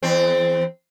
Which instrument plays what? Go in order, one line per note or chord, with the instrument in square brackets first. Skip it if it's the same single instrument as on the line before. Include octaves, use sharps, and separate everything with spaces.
[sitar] E2 C4